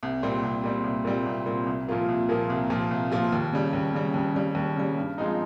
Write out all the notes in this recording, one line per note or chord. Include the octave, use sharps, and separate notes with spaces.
C2
A#2 G3 C4
C2
A#2 G3 C4
C2
A#2 G3 C4
C2
A#2 G3 C4
C2
A#2 F3 A#3 F4
C2
A#2 F3 A#3 F4
C2
A#2 F3 A#3 F4
C2
A#2 F3 A#3 F4
D#2
C#3 G3
D#2
C#3 G3
D#2
C#3 G3
D#2
C#3 G3
G2
F3 G#3 C4 D#4